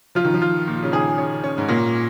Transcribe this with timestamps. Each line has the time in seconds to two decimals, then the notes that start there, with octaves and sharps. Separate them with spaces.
0.15 F3 F4
0.25 D#3
0.34 F3
0.42 F4
0.67 A#2
0.83 C#3
0.92 D#3 G#4
1.18 C#4
1.44 C#4
1.58 G#2
1.68 A#2 A#3